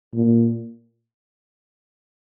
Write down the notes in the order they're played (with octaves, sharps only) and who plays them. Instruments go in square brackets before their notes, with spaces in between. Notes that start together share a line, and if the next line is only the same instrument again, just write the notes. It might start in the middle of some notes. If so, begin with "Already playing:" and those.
[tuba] A#2